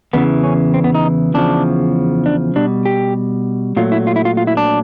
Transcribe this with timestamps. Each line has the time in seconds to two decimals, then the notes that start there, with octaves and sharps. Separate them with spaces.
0.13 E2 C#3 E3 B3
0.44 C#4
0.74 C4
0.84 B3
0.95 D#4
1.34 E2 C#3 F3 D4
2.26 D4
2.56 B2 G3 D4
2.86 G4
3.77 A#2 F#3 A3 F4
3.92 E4
4.07 F4
4.16 E4
4.25 F4
4.37 F4
4.47 E4
4.57 D4